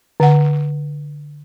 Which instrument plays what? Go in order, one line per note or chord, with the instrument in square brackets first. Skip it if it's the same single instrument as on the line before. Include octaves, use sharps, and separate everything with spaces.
[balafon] D3 F#5